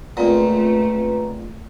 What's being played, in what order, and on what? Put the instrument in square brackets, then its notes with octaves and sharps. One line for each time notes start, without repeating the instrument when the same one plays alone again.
[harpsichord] C#2 A#2 [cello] A3 [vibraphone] C4 B4 A#5